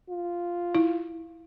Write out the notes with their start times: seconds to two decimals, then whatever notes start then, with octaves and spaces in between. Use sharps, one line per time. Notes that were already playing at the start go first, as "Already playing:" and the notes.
0.10 F4
0.75 E4